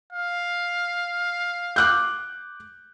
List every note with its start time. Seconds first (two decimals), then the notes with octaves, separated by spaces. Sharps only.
0.13 F5
1.76 D6 F#6 G6